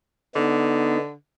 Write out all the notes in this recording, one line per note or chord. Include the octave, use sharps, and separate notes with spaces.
D3 B3 D#4